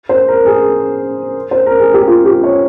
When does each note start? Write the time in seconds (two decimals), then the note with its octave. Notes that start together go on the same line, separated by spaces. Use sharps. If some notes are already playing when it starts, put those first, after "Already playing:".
0.09 C5
0.28 A#4
0.46 G#4
1.51 C5
1.66 A#4
1.79 G#4
1.94 G4
2.07 F4
2.25 G4
2.44 C#5